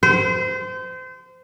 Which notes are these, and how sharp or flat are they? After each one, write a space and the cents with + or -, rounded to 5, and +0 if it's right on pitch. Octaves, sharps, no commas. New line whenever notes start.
C5 -30